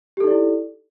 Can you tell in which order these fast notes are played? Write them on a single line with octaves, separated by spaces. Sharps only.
G4 A4 D#4 D5 E4